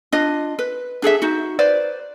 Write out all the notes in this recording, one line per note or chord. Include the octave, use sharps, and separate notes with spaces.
D4 F4 D#5
B4
D4 G#4 A4 E5
D#4 F#4
B4 C5 D5